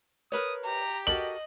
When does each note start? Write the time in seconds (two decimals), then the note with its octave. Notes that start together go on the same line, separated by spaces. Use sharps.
0.32 A#4 B4 C#5 D#6
0.65 G4 A#5
1.07 F#4 A4 A#4 D#5 F#7